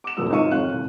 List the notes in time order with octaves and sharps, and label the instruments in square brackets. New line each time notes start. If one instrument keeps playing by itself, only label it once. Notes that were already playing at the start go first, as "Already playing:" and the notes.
[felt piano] D6 E7
F1 D#2 G#2 F#3 D#6 E6
G#1 D#4 F4 F5 C#6 D#7
G#1 F2 C4 C#5 F5 F#6
C2 A2